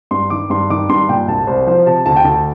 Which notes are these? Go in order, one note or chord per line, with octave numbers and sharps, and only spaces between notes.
G2 C6
D#3 D6
G2 C6
D#3 D6
G2 C6
A#2 G5
C2 A5
C2 C5
F3 C5
C3 A5
D2 A5
G5
D2 A5